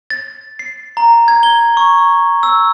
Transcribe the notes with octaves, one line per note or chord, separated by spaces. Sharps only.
A6
C7
A#5
G#6
G7
C#6
E6